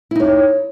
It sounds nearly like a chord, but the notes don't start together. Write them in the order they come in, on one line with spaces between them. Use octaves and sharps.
E4 D#4 C#5